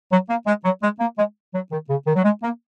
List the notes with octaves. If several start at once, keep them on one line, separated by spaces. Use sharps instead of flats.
F#3
A#3
G#3
F#3
G#3
A#3
G#3
F#3
D#3
C#3
D#3
F#3
G#3
A#3